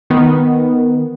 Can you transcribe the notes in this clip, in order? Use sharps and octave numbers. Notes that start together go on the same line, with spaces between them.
D#3 B3